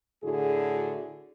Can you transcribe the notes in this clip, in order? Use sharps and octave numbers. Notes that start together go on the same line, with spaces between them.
A2 D3 E4 F#4 G#4